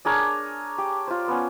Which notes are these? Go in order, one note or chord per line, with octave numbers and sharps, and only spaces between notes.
D4 G#4 A#4 C#5
G4
F4 C5
B3 C#4